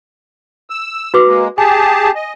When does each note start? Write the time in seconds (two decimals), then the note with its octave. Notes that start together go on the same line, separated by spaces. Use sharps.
0.70 E6
1.14 F#4 B4 D6
1.27 G#3 A#3
1.58 G4 G#4 G#5 A5
2.15 D#5